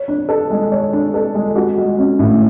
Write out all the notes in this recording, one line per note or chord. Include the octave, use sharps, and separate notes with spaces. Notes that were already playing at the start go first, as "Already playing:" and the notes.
Already playing: C#5
D4
A4
G#3
C#5
D4
A4
G#3
F#4
G#3
C#4
A2